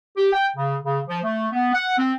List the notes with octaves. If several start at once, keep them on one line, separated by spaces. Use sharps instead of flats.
G4
G5
C#3
C#3
F3
A3
B3
F#5
C4